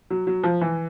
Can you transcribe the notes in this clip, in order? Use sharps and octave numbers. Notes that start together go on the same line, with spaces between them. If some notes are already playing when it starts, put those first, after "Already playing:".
F#3
F#3
F3
E3